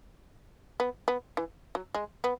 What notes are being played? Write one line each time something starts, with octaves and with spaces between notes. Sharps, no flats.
B3
B3
E3
F#3
G#3
B3